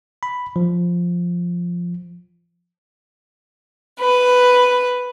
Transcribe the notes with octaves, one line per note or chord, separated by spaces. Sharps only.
B5
F3
B4